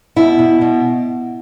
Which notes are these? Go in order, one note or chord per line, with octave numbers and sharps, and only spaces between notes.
B2 E4
B2
B2